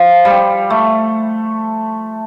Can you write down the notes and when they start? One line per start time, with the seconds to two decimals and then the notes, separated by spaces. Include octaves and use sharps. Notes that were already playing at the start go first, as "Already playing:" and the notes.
Already playing: F3
0.25 G3
0.70 A3